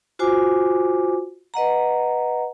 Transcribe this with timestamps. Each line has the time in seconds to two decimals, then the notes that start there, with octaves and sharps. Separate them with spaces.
0.19 F4 F#4 C5 G#5 D6
1.54 B4 D#5 F#5 A#5